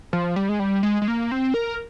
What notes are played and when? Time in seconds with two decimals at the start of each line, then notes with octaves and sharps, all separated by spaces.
0.13 F3
0.36 G3
0.49 G#3
0.59 G3
0.83 G#3
1.02 G#3
1.08 A#3
1.31 C4
1.54 A#4